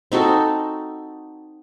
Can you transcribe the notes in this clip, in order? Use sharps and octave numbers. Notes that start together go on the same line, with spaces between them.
C4 D#4 F#4 A4